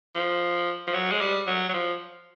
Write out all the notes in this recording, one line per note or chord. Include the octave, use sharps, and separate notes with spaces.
F3
F3
F#3
G#3
G3
F#3
F#3
F3